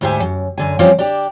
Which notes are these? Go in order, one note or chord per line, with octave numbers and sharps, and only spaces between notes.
D2 G#2 G4 C5 E5 G#5
F#2
F#2 D3 G#5
F3 G3 C4 C#4 F4 D5
D4 G4 D5